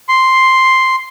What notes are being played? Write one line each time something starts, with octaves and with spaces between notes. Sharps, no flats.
C6